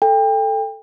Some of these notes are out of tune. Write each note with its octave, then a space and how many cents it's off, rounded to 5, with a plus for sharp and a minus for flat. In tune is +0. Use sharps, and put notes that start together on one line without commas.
A4 +0 G5 +30